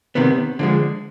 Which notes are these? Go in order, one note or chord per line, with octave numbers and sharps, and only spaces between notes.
C3 D#3 B3
D3 F3 G#3